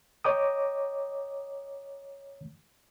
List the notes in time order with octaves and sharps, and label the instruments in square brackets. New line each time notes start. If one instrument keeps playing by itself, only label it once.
[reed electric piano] C#5 D#5 G5 A#5 D6 D#6